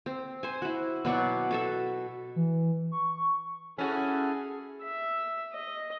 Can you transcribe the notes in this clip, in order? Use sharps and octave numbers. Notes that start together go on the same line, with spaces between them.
C4
C5 G#5
E4 F#4
B2 F#3 D5 C#6
F#4 A4 E5
E3
C#6
C#4 E4 F#4 G#4 A4 G#5
E5
D#5